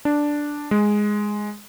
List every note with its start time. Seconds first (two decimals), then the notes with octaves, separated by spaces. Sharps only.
0.05 D4
0.71 G#3